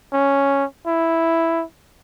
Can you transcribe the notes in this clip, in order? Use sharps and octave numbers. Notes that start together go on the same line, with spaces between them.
C#4
E4